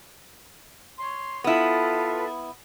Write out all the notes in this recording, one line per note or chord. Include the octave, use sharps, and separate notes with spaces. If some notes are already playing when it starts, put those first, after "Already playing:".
C#5 C6
B3 E4 F4 A4 B4